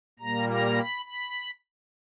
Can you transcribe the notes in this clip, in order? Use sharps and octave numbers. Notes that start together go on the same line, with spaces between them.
A#2 G3 A#3 A#5
A#5
B5
B5